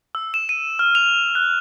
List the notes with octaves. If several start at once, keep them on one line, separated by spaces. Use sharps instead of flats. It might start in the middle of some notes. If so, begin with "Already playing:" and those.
E6
E7
D#7
F6
F7
F#6